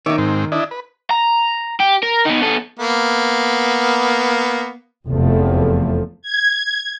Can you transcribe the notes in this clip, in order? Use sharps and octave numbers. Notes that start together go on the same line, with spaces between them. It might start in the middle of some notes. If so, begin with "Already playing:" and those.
D#3 D#4 C#5 E5 D6
G#2 C4
D4 E4 D#5
B4
A#5
G4
A#4
B3 D#4
B3 A4
A#3 B3
F1 E2 C3 F3 A3
G#6